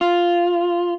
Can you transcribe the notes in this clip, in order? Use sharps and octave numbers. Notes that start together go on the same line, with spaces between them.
F4